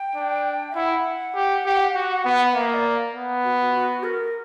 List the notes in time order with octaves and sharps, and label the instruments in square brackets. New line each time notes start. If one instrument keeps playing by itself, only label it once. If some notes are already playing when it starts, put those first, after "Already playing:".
Already playing: [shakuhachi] G5
[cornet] D4
[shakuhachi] E5
[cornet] E4 [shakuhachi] F#5
[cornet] G4
G4
F#4
B3
[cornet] A#3 [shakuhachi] E5
[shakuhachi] D5
[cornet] B3
[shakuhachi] F#4
F#4
A#4